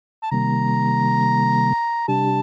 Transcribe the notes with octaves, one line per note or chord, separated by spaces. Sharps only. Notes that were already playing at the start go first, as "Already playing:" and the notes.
A5
C3 D#3 G3 A#3 A#5
C3 G3 D4 G4 A5